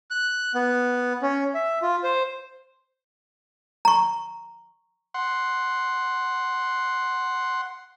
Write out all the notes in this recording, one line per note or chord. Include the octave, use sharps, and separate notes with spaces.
F#6
B3
C#4
E5
F4
C5
A#5 C#6
F#5 C6